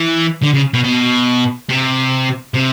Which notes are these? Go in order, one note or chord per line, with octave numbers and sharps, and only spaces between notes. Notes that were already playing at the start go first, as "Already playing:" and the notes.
Already playing: E3
D3
C#3
B2
B2
C3
C3